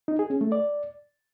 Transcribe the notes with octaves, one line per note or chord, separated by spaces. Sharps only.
D#4
G#4
C#4
A3
D5